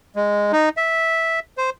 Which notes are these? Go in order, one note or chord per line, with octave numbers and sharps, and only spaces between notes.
G#3
D#4
E5
C5